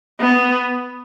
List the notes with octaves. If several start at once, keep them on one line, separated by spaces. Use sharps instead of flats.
B3